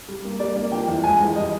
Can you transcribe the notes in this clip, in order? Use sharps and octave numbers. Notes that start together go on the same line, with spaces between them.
G3
A#3
G3 D5
A#3
F3 G5
E2
G#3 G#5
E2
G3 D#5